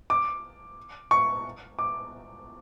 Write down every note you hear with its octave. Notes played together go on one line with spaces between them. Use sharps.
D6
C#6
D6